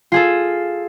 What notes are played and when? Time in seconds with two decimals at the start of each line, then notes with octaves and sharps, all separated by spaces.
0.12 F4 G#4 A4